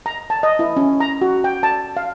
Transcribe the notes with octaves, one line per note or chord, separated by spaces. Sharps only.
A#5
A5
D#5
E4
C#4
A#5
F#4
G5
A5
F5